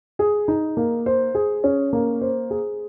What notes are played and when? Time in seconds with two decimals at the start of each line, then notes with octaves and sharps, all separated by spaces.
0.19 G#4
0.48 D#4
0.77 A#3
1.06 C5
1.35 G#4
1.64 C#4
1.93 A#3
2.21 C5
2.50 G#4